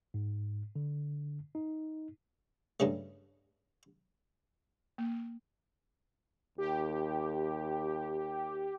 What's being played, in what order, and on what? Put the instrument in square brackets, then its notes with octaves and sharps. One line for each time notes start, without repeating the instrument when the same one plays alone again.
[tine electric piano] G#2
D3
D#4
[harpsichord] G2 C#3 G3 A3
[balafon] A#3
[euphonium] D#2 [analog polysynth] G4